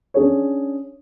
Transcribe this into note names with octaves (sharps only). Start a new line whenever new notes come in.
C#4 D4 G#4 C#5